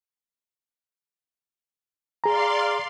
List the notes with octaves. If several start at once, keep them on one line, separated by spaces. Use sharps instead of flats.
G#4 D5 F5 A#5 C6